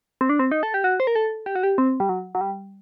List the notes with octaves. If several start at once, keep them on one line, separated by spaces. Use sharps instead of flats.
C4
D4
C4
D#4
A4
G4
F#4
C5
A#4
A4
G4
F#4
G4
C4
G3
F#3
F#3
G3